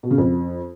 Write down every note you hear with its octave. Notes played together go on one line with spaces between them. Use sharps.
B2
C#3
F2